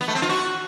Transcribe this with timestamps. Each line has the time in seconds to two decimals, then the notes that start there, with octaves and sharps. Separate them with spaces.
0.01 B3
0.08 A3
0.15 C4
0.22 F4
0.29 F#4